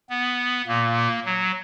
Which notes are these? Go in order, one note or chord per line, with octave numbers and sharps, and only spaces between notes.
B3
A#2 A#3
F#3